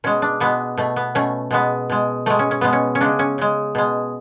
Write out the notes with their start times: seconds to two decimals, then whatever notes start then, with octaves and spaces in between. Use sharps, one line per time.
0.04 B2 G#3 C#4
0.22 D4
0.40 B2 G#3 B3
0.78 B2 A3
0.96 B3
1.15 B2 A3 C#4
1.51 B2 G#3 B3
1.90 B2 G#3
2.26 B2 G#3 A3
2.39 C#4
2.51 C#4
2.61 B2 G#3 B3
2.73 C#4
2.95 C#4
3.01 C#3 G#3 D4
3.19 C#4
3.38 C#3 G#3
3.75 B2 G#3